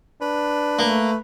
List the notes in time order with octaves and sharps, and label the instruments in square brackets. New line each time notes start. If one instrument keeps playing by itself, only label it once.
[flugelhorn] D4 [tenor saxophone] B4
[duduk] A3 [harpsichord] A#3